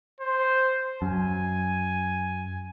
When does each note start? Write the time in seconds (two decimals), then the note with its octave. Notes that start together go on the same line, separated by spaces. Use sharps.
0.20 C5
1.02 F#2 G#5